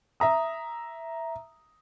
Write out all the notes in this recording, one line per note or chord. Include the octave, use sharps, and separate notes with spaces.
E5 A#5 D#6